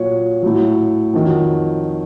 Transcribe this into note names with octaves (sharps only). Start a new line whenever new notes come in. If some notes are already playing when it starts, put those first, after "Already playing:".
Already playing: A#2 F#3 C#5
A2 F#3
F2 D#3 F#3